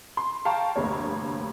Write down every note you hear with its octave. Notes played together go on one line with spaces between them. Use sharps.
C6
F5 G5 A5 A#5 C#6
F1 D2 G2 A#3 C#5